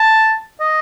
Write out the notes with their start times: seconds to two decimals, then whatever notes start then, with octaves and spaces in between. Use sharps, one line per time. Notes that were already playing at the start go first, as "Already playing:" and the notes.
Already playing: A5
0.60 D#5